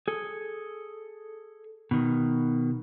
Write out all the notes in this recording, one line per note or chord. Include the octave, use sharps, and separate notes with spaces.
G#4 A4
B2 D#3